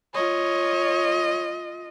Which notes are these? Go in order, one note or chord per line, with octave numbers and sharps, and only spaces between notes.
F4 C#5 D#5